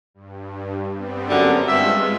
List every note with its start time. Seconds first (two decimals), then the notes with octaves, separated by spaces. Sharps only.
0.14 G2
0.93 G3 B3 C4
1.29 F#2 D3
1.67 G2 G#3 F4 E5